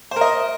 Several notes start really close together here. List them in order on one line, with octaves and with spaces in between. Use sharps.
C5 A#4 D#5